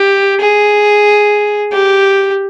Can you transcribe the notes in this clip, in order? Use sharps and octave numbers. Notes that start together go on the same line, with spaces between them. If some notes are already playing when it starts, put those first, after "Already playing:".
Already playing: G4
G#4
G4